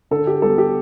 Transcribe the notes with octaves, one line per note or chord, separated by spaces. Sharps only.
D3 A4
G4
G3 B3 A4
G4